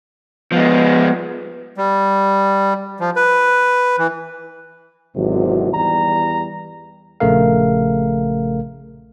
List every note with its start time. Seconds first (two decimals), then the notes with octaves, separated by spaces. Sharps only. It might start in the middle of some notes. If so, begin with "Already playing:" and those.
0.52 F3 G#3 B3
1.77 G3
3.00 F3
3.16 B4
3.99 E3
5.16 G#1 E2 C3 F#3
5.73 E2 G3 A#5
7.20 A#1 C#3 A3 A#4 F5